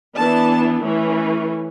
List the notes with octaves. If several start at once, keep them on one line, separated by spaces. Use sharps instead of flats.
E3 B3 D4 A5
E3 A3 C#4